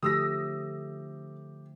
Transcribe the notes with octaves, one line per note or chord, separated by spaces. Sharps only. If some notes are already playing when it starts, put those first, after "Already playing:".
D3 F3 A3 G4 D#6 E6 A#6